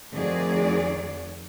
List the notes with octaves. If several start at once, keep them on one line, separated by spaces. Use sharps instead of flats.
F2 D#3 A3 F#4 G#4 D5